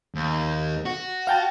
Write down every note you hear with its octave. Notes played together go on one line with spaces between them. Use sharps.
D#2
F#4
F5 G5 A5